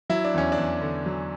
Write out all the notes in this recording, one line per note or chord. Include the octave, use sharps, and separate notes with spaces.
F#3 E4
D4
E2 C#4
D4
E2
D3
F#3